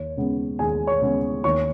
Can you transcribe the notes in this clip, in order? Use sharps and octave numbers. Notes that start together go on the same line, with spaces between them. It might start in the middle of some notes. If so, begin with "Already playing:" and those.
Already playing: D#2 C#5
C#3 G#3 B3
D#2 G#4 G#5
C#5 C#6
C#3 G#3 B3
D#2 C#5 C#6